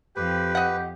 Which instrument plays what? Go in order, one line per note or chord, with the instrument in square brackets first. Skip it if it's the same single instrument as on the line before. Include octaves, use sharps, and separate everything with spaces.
[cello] F2 [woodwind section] G4 [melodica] B4
[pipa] D#5 F#5